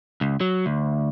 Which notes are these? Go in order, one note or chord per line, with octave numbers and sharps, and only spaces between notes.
C#2
F#3
D2